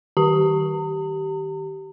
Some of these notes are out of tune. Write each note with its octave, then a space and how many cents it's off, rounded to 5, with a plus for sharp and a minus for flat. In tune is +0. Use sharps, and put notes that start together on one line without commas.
D#3 +0 G4 -15 A#5 -40